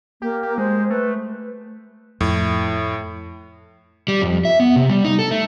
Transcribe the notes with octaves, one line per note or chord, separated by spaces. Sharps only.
A#3 G4
G4
G#3 C5
A3 B4
F2 A2
G3
F2
E5
B3
C3
G3
D#4
A4
A3